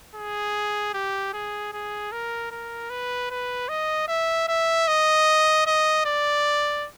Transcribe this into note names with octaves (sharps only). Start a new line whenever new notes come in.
G#4
G4
G#4
G#4
A#4
A#4
B4
B4
D#5
E5
E5
D#5
D#5
D5